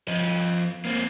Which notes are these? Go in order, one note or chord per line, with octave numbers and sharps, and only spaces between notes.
F3 D#5
A#3 C4